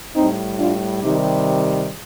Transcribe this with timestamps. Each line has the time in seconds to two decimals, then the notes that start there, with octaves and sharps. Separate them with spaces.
0.15 A2 G3 C4 D#4
0.59 D4 F4
1.02 C3 D#3 G3 D#4 G4